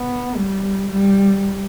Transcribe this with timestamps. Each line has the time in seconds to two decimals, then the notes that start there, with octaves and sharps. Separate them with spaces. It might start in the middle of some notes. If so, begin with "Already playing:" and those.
Already playing: B3
0.36 G3
0.91 G3